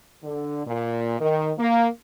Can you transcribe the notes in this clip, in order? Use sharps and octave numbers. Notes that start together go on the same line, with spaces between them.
D3
A#2
D#3
A#3